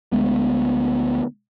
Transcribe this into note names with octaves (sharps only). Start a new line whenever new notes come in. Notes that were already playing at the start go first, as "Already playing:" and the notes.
D2 G#3 B3